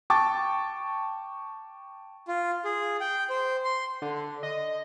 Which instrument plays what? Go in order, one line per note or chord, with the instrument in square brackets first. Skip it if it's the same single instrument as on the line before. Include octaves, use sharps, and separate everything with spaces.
[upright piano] G5 A5 C#6 D6 A6
[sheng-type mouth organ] F4
G#4
G5
C5
C6
[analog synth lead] D3
D#5